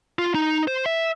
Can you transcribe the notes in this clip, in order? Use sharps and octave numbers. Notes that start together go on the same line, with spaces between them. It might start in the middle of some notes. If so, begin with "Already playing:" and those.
F4
D#4
C5
E5